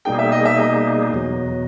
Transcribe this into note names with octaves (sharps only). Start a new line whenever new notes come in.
B2 G3 A#3 D#4 G#4 G5
E5
D#5
E5
D#5
E2 B2 F#3